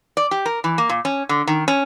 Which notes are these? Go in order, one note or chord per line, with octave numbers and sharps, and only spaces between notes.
D5
G4
A#4
E3
A#3
A#2
C#4
D3
D#3
C#4